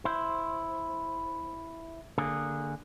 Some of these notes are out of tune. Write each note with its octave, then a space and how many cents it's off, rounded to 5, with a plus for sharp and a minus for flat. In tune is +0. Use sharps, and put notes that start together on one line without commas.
E4 +0 C5 +0
D3 +0 A#3 -15 G#4 -10